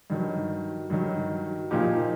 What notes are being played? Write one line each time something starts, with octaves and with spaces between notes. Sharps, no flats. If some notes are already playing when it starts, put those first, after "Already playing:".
G2 D#3 F#3
G2 D#3 F#3
A#2 F3 A#3 D#4 G4